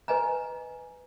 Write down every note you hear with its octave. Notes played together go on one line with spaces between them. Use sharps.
B4 D#5 G#5 A#5